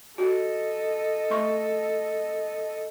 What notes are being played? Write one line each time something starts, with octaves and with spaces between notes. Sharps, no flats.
F#4 A4 D#5
A3 C6 C#6